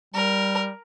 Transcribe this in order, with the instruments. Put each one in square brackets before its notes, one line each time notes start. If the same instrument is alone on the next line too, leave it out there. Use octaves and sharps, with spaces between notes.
[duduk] G3 [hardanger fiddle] A#4